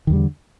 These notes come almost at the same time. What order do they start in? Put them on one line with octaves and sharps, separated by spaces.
D#3 E2 G3 D3